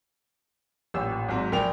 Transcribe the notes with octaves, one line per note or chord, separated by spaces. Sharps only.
A1 A#2 G4 E6
G#1 G#2 F#3
A#1 A#4 G5 F7